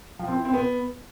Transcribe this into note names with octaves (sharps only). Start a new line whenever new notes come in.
F3
C4
E4
C4
B3